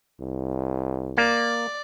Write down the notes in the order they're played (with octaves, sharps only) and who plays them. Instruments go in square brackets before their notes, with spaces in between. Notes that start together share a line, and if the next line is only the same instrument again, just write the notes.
[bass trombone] C2
[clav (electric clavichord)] A#3 [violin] D5